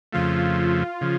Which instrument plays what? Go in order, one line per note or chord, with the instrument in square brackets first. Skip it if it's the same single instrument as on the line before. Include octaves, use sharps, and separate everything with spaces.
[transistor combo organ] F2 C#3 F3 A3 [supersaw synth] F4
[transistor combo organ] C#3 F3